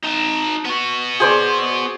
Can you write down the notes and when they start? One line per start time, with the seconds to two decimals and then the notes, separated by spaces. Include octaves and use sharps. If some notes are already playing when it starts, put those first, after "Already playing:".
0.03 D#4 A5
0.65 B3 F#4
1.20 G#4 C5 D5